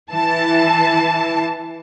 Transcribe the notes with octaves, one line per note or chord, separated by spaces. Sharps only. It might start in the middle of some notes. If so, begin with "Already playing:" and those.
E3 A5